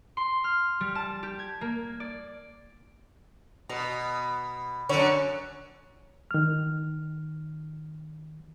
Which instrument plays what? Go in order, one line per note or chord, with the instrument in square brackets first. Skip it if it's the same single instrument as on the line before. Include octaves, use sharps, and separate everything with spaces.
[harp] C6
F6
G3
A5
G4
G#6
A#3
D5
[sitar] B2 [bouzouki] A#5
[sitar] F#2 D3 [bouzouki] C#5
[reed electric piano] D#3 F6